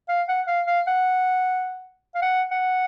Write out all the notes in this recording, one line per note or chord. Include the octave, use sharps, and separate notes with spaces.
F5
F#5
F5
F5
F#5
F5
F#5
F#5